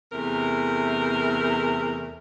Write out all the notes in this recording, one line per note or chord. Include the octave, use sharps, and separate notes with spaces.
E2 C3 A3 A#4